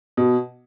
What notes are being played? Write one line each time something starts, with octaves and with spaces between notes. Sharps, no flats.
B2